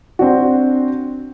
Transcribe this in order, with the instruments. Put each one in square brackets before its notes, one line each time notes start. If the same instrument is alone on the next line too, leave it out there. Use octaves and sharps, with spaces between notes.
[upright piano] C4 D4 F#4